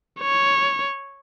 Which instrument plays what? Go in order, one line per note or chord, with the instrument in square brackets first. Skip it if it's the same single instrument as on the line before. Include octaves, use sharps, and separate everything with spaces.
[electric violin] C#5